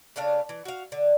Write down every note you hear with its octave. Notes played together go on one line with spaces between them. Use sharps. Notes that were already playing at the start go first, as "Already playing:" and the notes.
C#3 A3 D4 F5
E3
F#4 F5
D3